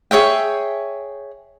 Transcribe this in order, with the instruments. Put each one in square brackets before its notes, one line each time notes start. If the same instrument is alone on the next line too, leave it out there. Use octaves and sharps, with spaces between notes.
[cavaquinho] G#4 C#5 E5 G5